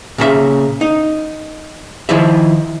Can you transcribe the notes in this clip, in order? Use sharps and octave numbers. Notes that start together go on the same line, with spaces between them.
A#2 C#3 A4 E5
D#4
D#3 F3 E4 C5 E5